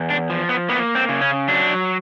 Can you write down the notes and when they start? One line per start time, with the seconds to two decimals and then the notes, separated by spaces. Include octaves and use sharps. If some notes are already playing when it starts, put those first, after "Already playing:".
Already playing: E2
0.10 D4
0.30 F3
0.49 B3
0.69 A#3 B3
0.95 C4
1.09 C#3
1.21 C#4
1.48 F#3 D4